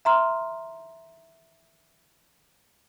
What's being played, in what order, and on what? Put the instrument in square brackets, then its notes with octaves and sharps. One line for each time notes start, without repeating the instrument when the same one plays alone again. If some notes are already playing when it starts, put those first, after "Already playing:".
[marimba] E5 A#5 C6 F6